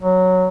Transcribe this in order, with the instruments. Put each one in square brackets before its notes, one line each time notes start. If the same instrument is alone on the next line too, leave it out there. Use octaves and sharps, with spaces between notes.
[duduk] F#3